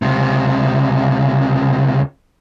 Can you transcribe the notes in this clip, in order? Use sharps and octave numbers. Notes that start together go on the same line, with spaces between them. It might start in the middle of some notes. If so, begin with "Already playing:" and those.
C#2 C3